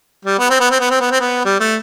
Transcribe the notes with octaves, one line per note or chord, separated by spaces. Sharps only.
G3
B3
C4
B3
C4
B3
C4
B3
C4
B3
G3
A3